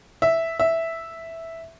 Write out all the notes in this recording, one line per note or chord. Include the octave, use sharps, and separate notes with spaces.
E5
E5